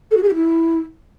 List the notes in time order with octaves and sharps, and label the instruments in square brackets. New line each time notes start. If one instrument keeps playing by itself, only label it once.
[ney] A4
F#4
G#4
G4
E4